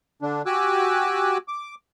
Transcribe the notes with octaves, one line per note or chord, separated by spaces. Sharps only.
D3 D4
F#4 G4 G#5 D6 E6 F#6
D6